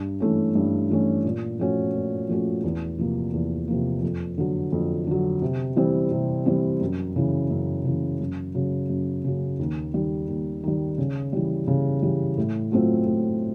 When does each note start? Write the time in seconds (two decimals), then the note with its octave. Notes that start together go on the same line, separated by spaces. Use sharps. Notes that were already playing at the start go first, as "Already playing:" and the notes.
Already playing: G2
0.20 E3 A3 C#4
0.55 G2
0.90 E3 A3 C#4
1.24 A#2
1.59 F3 A3 C#4 F#4
1.94 A#2
2.29 F3 A3 C#4 F#4
2.64 E2
2.98 C3 F3 A#3
3.33 E2
3.68 C3 F3 A#3
4.03 F2
4.38 D3 F#3
4.72 F2
5.07 D3 F#3
5.42 C3
5.76 E3 G3 C4
6.11 C3
6.46 E3 G3 C4
6.81 F#2
7.16 C#3 E3
7.50 F#2
7.85 C#3 E3
8.20 F#2
8.55 C#3 F#3
8.90 F#2
9.24 C#3 F#3
9.59 D#2
9.94 D#3 G3
10.28 D#2
10.63 D#3 G3
10.98 C#3
11.33 E3 G3
11.68 C#3
12.03 E3 G3
12.37 A2
12.72 F#3 A3 C4 F4
13.06 A2